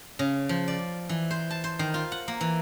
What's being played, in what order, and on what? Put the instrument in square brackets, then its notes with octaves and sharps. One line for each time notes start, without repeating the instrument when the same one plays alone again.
[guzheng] C#3
F3
D5
E3
C5
A5
C5
D#3
F4
F#5
A#3
E3